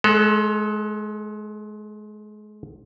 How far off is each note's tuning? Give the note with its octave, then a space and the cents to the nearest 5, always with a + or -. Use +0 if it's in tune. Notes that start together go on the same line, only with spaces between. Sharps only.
G#3 +30 A4 +0